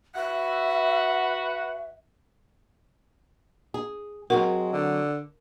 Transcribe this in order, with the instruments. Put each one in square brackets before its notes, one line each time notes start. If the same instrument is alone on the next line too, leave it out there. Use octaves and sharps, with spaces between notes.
[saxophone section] F#4 B4 F#5 [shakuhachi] E5
[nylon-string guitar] G#4
[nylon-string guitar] F#3 C4 F#4 [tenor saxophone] G#3 [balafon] A#4
[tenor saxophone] D3